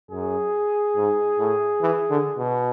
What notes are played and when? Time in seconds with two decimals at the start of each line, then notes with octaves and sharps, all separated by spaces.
0.11 F#2 G#4
0.96 G#2
1.39 A2
1.81 E3
2.10 D3
2.38 B2